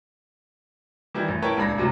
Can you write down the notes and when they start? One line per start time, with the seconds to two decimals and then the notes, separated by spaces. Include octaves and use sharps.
1.15 D#3 E3 G3 E4
1.28 A1
1.42 E4 A#4 B4 C#5 G5 A5
1.57 D#1 C#2 D4 B5 A#6
1.78 F#2 A2 C3